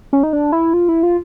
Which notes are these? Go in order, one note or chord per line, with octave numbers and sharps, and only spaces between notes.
C#4
D#4
D4
E4
F4
E4
F4